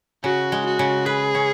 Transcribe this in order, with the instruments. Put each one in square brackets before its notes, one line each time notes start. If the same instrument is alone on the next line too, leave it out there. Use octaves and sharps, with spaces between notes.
[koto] C#3 [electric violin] F#4
[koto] G#3
[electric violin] F#4
[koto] C#3
[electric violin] G#4 [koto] B4
[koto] C#4